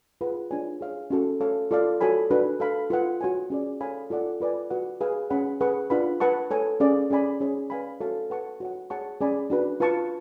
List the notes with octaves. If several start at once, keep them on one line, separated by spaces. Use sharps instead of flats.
F4 G#4 B4 F#5
D4 F4 G#4 C#5 G#5
G#4 C#5 F5
C#4 F#4 A4
A4 C#5 F5
F4 A4 D5 F5
F#4 A4 C#5 G#5 B5
D4 F#4 B4
A4 F5 B5
F4 B4 F#5
F#4 C#5 G#5
C#4 G#4 D5
A4 C#5 F5 G#5 B5
F4 A4 D5 F#5
F4 B4 D5 G#5
F#4 B4 F#5
G#4 B4 F5 G#5
C#4 G#4 C#5 F#5 B5
G#4 B4 F#5 C#6
D4 F4 B4 F#5 B5
B4 F#5 A5 C#6
A4 C#5 G#5
C#4 G#4 D5 F5
C#4 G#4 D5 G#5 B5
C#4 G#4 C#5
B4 D5 F5 G#5 B5
F#4 A4 C#5 F5 A5
B4 F#5 A5 C#6
F#4 C#5 F#5
G#4 C#5 F#5 A5 C#6
C#4 G#4 D5 G#5 B5
D4 F#4 B4
F4 B4 F5 A5 C#6